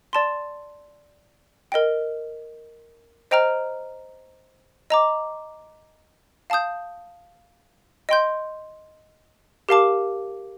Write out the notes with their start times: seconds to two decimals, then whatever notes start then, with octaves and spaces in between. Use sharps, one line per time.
0.13 D5 A5 C6
1.72 A#4 D#5 G5
3.31 C5 D#5 G5 A#5 F6
4.90 D#5 A#5 D6
6.50 F5 A5 D#6 G6
8.09 D#5 G5 C6 G6
9.69 G4 A#4 F5 A5 D6